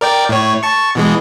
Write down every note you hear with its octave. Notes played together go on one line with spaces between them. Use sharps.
A#4 D5 G5
A2 C#5
A5 C#6
B2 E3 G#3